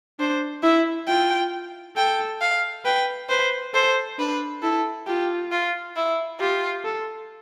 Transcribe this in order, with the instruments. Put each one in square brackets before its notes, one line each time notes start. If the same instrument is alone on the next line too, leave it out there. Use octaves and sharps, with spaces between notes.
[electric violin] D4 [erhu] C5
[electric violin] E4 [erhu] E5
[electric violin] F4 [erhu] G5
[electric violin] A4 [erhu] G5
[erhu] F5
[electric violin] B4 [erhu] G5
[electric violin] B4 [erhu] C5
[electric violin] A4 [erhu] C5
[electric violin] D4 [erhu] B4
[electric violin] E4 [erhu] A4
[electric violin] F4 [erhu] G4
[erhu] F4
E4
[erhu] F4 [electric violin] G4
[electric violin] A4